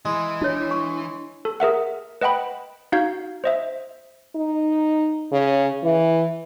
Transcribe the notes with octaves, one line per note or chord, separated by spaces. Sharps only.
E3 G#3
D4 E4 C#5
C#6
A4
G#4 A#4 E5 F#5
B4 D#5 F#5 G5 B5
D#4 F#4 F5 G6 G#6
C5 D#5 E5
D#4
C#3
E3